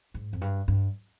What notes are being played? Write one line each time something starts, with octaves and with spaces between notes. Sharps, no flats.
G#2
F2
G2
G2